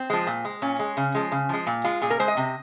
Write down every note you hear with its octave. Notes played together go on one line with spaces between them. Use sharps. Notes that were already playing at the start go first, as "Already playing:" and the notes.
Already playing: C4
F3 G#3
A#2
G#3
A#2 C#4
G#3
C#3
F3 G#3
C#3
F3 G#3
A#2
G#3 F4
A#2 G#4
A#4
G#3 C5
D#5
C3